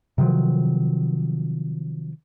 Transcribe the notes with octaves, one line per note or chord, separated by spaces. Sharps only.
C3 D#3 F3 F#3